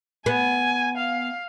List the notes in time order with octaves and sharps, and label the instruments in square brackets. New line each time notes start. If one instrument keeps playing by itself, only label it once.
[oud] B3 [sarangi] G#5
[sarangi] F5